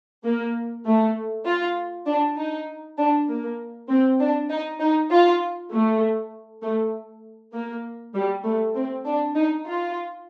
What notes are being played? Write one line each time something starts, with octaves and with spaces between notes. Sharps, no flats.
A#3
A3
F4
D4
D#4
D4
A#3
C4
D4
D#4
D#4
F4
A3
A3
A#3
G3
A3
C4
D4
D#4
F4